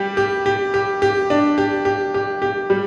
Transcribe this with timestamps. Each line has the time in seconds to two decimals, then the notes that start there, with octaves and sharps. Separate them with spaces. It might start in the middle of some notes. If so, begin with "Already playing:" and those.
Already playing: G3 G4
0.17 G4
0.46 G4
0.74 G4
1.02 G4
1.30 D4
1.58 G4
1.85 G4
2.14 G4
2.42 G4
2.70 G3